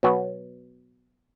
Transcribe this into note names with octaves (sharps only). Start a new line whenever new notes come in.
B2 F#3 B3